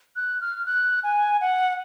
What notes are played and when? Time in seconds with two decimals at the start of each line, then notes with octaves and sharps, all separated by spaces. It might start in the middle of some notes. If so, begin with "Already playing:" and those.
0.16 F#6
0.41 F6
0.66 F#6
1.03 G#5
1.41 F#5